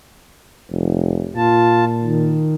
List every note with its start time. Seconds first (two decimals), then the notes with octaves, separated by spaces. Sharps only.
0.71 F1
1.36 A#2 F4 A5
2.03 D#3